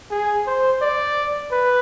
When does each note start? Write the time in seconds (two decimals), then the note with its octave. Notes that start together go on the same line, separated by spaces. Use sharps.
0.11 G#4
0.47 C5
0.82 D5
1.52 B4